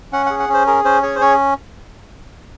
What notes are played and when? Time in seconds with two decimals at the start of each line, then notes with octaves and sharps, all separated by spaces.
0.12 C#4 F#5
0.26 G#4 F#5
0.40 F#5
0.49 C#4 C5
0.67 G#4 A#4
0.85 C#4 C5
1.03 G#4 C#5
1.15 C5
1.21 C#4 C#5